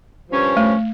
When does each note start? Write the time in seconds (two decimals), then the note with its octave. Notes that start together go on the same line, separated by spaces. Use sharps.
0.29 G2 F3 C#4
0.57 A3